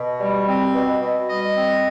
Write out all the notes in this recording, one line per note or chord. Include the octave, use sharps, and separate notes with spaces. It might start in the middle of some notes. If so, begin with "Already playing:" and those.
Already playing: B2
G3
C4
B2
B2
G3 D#5
C4